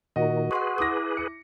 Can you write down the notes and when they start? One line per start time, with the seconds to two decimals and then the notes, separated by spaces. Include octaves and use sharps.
0.16 A#2 D#3 F#4 D#5
0.51 G#4 B4 F#5 C6 C#6
0.78 E4 D6 D#6 A#6
1.17 C#7